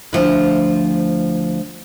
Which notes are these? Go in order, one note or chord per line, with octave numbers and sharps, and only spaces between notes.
D2 F3 E4